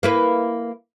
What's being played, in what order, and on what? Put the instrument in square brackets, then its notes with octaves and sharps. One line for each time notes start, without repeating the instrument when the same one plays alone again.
[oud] A#3 E4 B4